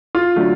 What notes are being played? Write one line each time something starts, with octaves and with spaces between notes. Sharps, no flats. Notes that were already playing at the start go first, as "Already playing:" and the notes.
F4
D3 F#3 A3